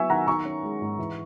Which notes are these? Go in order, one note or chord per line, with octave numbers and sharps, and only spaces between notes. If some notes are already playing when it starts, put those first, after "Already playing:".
Already playing: F#3 B3 E4 E5 G#5 C#6 E6
D#3 F#5 A#5
D#3 A#5 C#6
C#4
G#3
G#2
E3